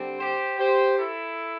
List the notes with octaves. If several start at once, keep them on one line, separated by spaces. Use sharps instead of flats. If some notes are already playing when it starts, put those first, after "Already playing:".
Already playing: D3 G3 C4
G4 C5
G4 C5
E4 A4